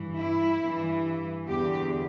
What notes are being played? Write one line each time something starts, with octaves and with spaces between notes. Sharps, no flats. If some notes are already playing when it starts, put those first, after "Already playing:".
Already playing: G2 E3
E4
G2 E3
E2 D3 G4